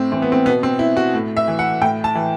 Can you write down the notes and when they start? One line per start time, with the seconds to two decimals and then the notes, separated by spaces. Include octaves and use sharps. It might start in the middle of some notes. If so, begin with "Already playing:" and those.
Already playing: A2 C4
0.12 E3 C4
0.22 B3
0.32 C4
0.46 B2 B3
0.63 C4
0.79 E4
0.97 F#4
1.14 A2
1.37 E5
1.48 E3
1.59 F#5
1.82 A2 G5
2.04 A5
2.15 E3